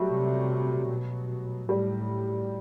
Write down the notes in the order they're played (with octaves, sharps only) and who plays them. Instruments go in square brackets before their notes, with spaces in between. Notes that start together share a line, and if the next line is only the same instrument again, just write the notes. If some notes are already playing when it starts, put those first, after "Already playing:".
Already playing: [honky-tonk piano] F#3 G3 A3
[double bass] C3
B2
[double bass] A2 [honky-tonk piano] G3